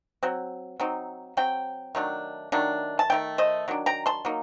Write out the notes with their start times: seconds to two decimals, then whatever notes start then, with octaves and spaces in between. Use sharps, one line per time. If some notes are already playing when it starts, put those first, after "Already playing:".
0.23 F#3 C4
0.80 F#3 C4 D#4
1.37 F#3 C4 G5
1.95 D#3 F#3 A3 D4
2.52 D#3 F#3 A3 D4
2.99 A5
3.10 D#3 F#3 A3 G5
3.38 C5 D#5
3.68 D#3 F#3 D4
3.86 G5 A#5
4.06 A5 C6
4.25 F#3 A#3 D#4